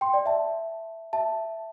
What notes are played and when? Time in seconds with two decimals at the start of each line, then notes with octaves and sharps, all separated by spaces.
0.01 G5 C6
0.14 D5 G5
0.26 E5 A5
1.13 E5 A5